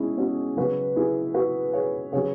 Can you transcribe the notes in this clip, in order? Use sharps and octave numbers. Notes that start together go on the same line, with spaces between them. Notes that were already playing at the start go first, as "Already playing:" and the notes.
Already playing: B2 G#3 C#4 E4 G#4
C#4 F#4
C#3 F#3 F#4 B4
E4 G#4
F#4 B4
G#4 C#5
C#3 F#3 G#4 C#5